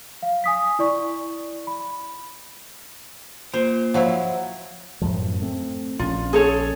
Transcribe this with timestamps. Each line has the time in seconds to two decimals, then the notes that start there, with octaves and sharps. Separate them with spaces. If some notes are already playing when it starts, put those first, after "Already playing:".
0.23 F5
0.44 G#5 D#6 B6
0.79 E4 D5 C#6
1.67 B5
3.54 A#2 C5
3.94 F3 F#3 E4
5.02 F#2 A2 F3
5.42 A3 C4
5.99 A#1 C#3 C#4 F4
6.33 G#4 A4 C#5